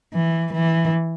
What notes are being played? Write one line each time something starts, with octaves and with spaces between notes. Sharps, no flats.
E3
E3